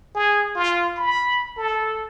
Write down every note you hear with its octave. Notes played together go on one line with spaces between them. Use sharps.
G#4
F4
B5
A4